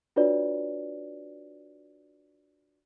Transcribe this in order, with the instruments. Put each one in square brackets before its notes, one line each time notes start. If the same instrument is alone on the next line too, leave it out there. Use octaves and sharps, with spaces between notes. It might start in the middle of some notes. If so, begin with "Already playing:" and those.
[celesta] D4 F4 F#4 B4 C#5 D5